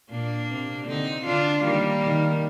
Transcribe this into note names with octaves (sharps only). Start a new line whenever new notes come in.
A#2 A#3 D4
C3
D3 C4 D#4
D3 D4 F4
D#3 G3 A#3
D#3